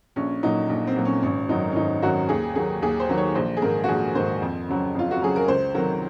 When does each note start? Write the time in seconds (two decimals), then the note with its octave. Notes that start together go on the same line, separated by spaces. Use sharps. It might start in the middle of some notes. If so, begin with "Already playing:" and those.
0.16 A#1 C#4
0.43 A#2 F#3 D#4
0.69 A#1
0.87 C4
0.96 A#2 F#3
1.05 C#4
1.23 G#1 C#4
1.49 F#2 D#3 F#3 D#4
1.72 C#4
1.76 G#1 D#4
2.02 F#2 D#3 F#3 F#4
2.29 D#2 G#4
2.55 D#3 F#3 G#4
2.82 D#2 G#4
3.00 C5
3.09 D#3 F#3
3.17 C#5
3.35 A#1 C5
3.57 G#4
3.62 G#2 D#3 A#4
3.84 F#4
3.88 A#1 G#4
4.15 G#2 D#3 C5
4.42 F2
4.69 C#3 F#3
4.95 F2 F4
5.11 F#4
5.22 C#3 F#3 G#4
5.36 A#4
5.48 C#2 C5
5.74 C3 D#3 F#3 A#4